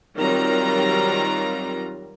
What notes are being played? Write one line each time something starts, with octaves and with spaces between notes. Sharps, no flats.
D#3 F#3 G3 C4 F4 A#5